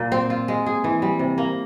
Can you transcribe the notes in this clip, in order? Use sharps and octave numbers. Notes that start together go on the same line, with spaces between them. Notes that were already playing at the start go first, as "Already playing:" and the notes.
Already playing: A#2 A#3
C4
F4
G#3
G#4
E3
G3
C3
A#3